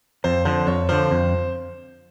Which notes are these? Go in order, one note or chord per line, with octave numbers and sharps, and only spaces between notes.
F2 C5
D3 F3 C5
F2 C#5
D3 F3 C5
F2